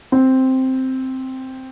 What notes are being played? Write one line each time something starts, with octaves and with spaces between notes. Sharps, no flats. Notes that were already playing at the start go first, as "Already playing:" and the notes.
C4